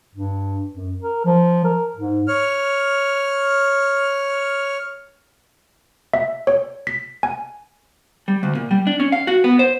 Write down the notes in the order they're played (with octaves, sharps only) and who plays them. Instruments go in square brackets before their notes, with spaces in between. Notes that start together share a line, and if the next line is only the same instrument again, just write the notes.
[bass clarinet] G2
F#2
A#4
F3
A#4
G#2
[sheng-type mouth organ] C#5 F6
[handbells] E5
C#5
B6
G#5
[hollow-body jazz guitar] G3
D2
A#2
G3
D4
C#4
F5
F#4
B3
C5